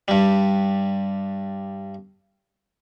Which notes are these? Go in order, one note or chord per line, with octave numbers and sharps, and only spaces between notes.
G2 G3